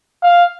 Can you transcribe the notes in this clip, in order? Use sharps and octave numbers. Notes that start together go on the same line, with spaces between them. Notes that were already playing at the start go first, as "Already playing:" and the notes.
F5